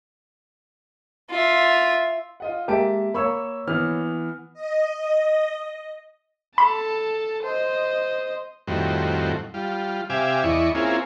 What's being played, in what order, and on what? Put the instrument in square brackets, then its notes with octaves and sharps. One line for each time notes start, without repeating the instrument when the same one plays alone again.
[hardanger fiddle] F4 E5
[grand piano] F4 D#5 F#5
[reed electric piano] G#3 A#3 G4 [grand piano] E5 A5 D7
[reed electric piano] A#3 C#5 [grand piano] B5 C#6 E6
[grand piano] E3 B3 F6
[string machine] D#5
[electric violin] A4 A5 [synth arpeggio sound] B5
[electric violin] C5 D#5
[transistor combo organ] F2 A2 D#3 G3 C4 F#4
G3 F4
C3 G4 E5 F5 G#5 D6
E2 E4 D5 D#5 C#6
A#3 C4 C#4 E4 F4 G#4